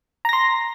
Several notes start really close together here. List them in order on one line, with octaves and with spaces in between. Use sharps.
A#5 A#6 C6